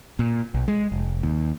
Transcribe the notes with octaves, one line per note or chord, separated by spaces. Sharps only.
A#2
B1
G#3
F1
D#2